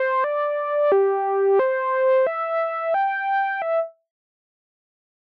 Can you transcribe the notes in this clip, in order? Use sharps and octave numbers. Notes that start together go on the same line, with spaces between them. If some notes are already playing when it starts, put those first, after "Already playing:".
Already playing: C5
D5
G4
C5
E5
G5
E5